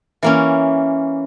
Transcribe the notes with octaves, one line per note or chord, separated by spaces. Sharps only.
E3 A#3 C#4